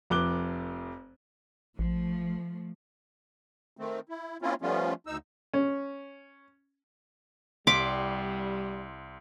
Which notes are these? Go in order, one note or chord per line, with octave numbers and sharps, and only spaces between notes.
F1 F2 D6 F#6 G7
A1 F3 A3
D#3 A3 C4
E4
A#3 C4 C#4 E4 F4
F3 G3 A3 B3 C#4 F4
D2 D#4 E6
C#4
C2 G3 C6 D6 B6